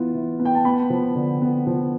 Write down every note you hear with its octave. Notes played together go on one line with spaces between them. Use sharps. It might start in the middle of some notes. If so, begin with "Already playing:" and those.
Already playing: E3 B3 F4
E3
B3
G5
A5
B3 B5
F3
D3
B3
F3